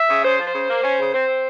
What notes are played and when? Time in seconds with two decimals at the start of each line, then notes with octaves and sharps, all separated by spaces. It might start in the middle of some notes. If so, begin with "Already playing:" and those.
Already playing: E5
0.09 C#3
0.24 C#3 C5
0.39 F3
0.47 C5
0.53 C#3
0.69 A#3
0.83 C#4
0.99 C#3
1.13 C4 C5
1.28 C4